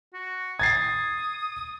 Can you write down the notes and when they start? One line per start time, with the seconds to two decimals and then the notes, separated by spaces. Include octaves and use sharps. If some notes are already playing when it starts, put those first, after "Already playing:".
0.13 F#4
0.59 D#6 G#6 A6 C7